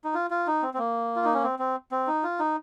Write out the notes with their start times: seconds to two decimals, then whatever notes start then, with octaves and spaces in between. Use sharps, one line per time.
0.04 D#4
0.14 F4
0.30 F4
0.47 D#4
0.62 C4
0.74 C4
0.78 A#3
1.16 F4
1.25 D#4
1.34 C#4
1.43 C4
1.59 C4
1.92 C4
2.07 D#4
2.23 F4
2.39 D#4